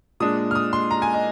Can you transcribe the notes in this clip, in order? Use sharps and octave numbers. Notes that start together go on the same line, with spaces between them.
A#2 G#3 D4 D#6
F6
D#6
C6
A#5
G#5
D#5